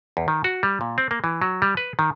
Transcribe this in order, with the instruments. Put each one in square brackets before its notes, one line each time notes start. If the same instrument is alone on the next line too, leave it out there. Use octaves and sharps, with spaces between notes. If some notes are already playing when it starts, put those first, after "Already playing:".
[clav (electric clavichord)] E2
D#3
F#4
G3
A#2
C4
A#3
E3
F#3
G3
B4
D#3